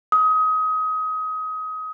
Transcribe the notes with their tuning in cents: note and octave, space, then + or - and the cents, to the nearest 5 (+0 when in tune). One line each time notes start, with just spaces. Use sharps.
D#6 +25